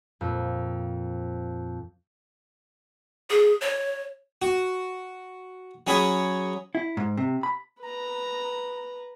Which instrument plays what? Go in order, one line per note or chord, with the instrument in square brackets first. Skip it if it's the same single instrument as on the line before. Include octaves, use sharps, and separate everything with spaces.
[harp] F2 A#2
[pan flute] G#4
C#5
[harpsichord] F#4
F#3 C#4 G#4 B5 D#6
[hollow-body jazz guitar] E4
G#2
C3
B5
[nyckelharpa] B4 A#5